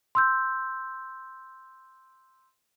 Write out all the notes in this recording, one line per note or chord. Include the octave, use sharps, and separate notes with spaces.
C6 E6 G6